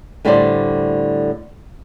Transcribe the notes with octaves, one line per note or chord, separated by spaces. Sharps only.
A2 D3 G3 A4 C5 D5